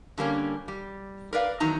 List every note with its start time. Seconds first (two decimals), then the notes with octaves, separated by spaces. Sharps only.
0.18 D3 G3 A#3 C#4
0.68 G3
1.33 A#4 B4 D5 F5
1.60 E2 D#3 F#3 D#4 A#5